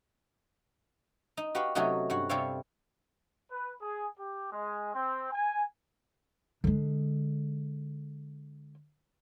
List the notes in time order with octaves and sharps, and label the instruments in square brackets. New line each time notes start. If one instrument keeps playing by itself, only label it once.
[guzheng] D#4
F#4 G4 B4 F5 F#5
C3 F#3 A3 C#4 D#4 F#4
G2 F#4 F#5
C3 G3 A4 C5 C#5 F5
[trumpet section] B4
G#4
G4
G#3
C4
G#5
[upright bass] D3 G#3